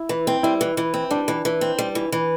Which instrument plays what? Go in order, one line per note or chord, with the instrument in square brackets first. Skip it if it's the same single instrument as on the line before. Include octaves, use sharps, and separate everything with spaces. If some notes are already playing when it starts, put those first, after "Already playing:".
Already playing: [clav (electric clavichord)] E4
[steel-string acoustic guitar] E3
C4
[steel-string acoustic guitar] G3 [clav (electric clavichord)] E4
[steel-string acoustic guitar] E3
E3
C4
[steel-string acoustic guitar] G3 [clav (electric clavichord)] D4
[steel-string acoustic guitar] E3
E3
C4
G3
E3
E3